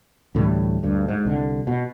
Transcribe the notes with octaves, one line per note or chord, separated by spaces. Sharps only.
D2 A2 E3 G3
D2 G2
G#2
C2 D3
B2